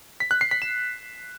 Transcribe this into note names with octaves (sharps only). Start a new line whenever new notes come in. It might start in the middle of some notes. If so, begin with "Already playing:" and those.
B6
F#6
C7
B6
E7